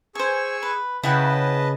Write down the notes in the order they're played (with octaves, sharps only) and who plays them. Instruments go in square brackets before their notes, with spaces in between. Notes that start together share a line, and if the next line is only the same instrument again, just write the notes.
[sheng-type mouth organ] G#4 C#6 E6 [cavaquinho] C5 G#5
[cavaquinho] B4
[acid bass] C#3 [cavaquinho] E4 F#5 G5 [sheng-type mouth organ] B4 D#5 A5